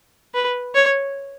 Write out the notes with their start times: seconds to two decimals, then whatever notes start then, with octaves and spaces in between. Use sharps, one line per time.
0.34 B4
0.75 C#5